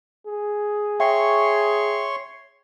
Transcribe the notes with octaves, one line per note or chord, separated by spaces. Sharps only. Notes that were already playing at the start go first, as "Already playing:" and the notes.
G#4
C#5 E5 G5 C6 C#6